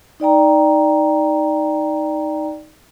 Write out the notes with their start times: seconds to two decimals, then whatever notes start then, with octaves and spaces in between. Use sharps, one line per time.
0.20 D#4 D5 G5 A#5